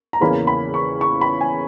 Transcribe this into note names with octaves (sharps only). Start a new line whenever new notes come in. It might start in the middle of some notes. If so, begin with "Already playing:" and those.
A#5
E2 C#3 E3 A#3 C#4 B5
B5
C#6
C#6
B5
G#5